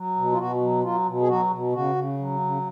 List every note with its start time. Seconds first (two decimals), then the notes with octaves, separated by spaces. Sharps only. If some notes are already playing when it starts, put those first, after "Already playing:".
Already playing: F#3
0.16 B2
0.32 F4
0.38 B2 F#4
0.61 F#3
0.83 F#3 F4
1.06 B2
1.21 G#4
1.28 F#3 F#4
1.50 B2
1.73 C#3 F#4
1.95 C#3
2.18 F#3
2.40 C#3